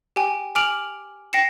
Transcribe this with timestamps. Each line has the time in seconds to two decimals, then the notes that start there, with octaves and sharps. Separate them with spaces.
0.16 G4 G5 G#5
0.55 G#5 D6 F6 D7 F7 F#7
1.33 G5 A#6 C7 C#7 E7